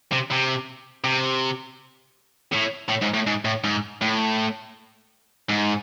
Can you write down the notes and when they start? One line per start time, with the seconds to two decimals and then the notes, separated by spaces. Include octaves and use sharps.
0.12 C3
0.31 C3
1.04 C3
2.53 A2
2.89 A2
3.02 G#2
3.14 A2
3.27 G#2
3.45 A2
3.64 G#2
4.01 A2
5.49 G#2